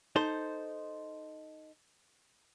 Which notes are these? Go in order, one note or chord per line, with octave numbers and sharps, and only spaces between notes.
D#4 A4 C5